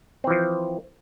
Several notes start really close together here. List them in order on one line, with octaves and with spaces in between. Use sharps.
C4 E3 F3